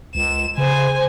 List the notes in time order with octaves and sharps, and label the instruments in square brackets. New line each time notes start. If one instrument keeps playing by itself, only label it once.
[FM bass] C#2 [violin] E7
[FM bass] C#3 [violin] C5 G#5